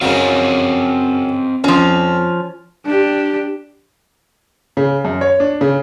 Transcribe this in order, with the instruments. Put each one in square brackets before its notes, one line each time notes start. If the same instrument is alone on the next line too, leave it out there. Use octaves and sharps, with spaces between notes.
[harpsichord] F#2 C#3 F#3 [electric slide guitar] C4 D#5 F5
[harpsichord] F2 [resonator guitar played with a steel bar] F3 C#4
[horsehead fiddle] D4 G4
[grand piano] C#3
F#2
C#5
D4
C#3